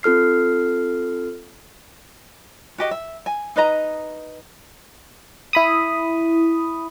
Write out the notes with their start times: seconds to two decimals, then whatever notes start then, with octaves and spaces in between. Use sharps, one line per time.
0.03 C4 F4 A4 F6 C7
2.78 F#4 G4 D#5
2.91 E5
3.26 G#5
3.56 D#4 B4 D#5 A#5
5.53 E4 B5 D#6